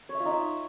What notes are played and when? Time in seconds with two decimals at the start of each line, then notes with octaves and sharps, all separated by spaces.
0.09 C#5
0.15 E5
0.20 F4
0.25 D#4
0.31 E5